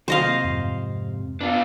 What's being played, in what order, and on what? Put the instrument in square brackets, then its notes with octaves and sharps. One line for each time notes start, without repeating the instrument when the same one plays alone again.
[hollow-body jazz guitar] C3 F4 [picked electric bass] F#3 A3 A#3 [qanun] C5 D#5 F5
[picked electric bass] F2 G#2
[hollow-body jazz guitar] B3 [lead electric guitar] D4 F4